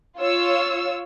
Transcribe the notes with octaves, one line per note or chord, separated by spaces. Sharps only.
F4 C#5 E6